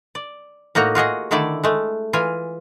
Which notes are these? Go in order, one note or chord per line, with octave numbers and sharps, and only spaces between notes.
D5
A2 A#3 D#4 F#4 A#5
F4 F#4 G#4 D#5
D3 D#3 A3 E4 D5
G#3 A3
E3 F4 G#5